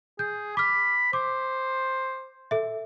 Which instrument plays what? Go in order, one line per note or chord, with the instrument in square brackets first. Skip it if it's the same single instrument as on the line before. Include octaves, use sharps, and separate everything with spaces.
[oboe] G#4 [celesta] G6
[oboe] B5 [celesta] D6 F6
[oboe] C5 [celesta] D6
[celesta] A4 E5